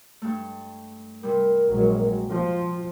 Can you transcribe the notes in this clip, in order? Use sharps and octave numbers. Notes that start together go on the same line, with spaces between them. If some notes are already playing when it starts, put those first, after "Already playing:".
G2 A3
C3 G3 A#4
A#1 F#3 G#3
F3 F4